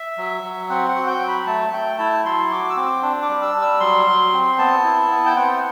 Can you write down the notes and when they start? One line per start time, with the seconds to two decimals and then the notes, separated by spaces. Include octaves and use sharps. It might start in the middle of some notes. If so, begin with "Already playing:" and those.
Already playing: E5
0.18 F#3
0.43 F#3
0.69 C4 F#5
0.88 F#5
0.95 F#4
1.07 G5
1.20 F#3
1.28 B5
1.46 A3 A5
1.72 A3 G5
1.98 E4 A5
2.24 F#3 C6
2.51 F#4 D6
2.70 E6
2.76 C4 D6
3.02 D4
3.22 D6
3.29 G3
3.42 E6
3.55 G3
3.62 E6
3.80 F#3 C6
4.07 F#3
4.33 C4
4.58 B3 A5
4.84 E4
5.11 B3
5.26 G5
5.36 C4 F#5